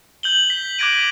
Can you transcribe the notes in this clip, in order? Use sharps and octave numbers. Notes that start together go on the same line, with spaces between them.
G6 F#7 G7
B6
D6 F#6 G#6 A#6 D7 D#7